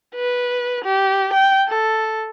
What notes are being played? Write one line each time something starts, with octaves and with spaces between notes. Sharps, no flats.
B4
G4
G5
A4